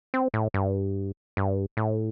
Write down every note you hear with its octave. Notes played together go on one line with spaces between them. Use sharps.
C4
A2
G2
G2
A2